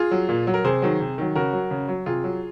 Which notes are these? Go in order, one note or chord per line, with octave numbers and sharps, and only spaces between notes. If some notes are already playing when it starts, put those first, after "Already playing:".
Already playing: F4 G#4
F#3
A#2
F#3
A#4
C3 G#4 C5
D#3 F#3
C3
D#3 F#3
C#3 F#4 A#4
F#3
C#3
F#3
C3 F4 G#4
F#3